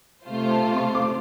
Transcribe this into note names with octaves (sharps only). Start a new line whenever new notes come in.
C3 A3 F4 C5
A5
C6
D6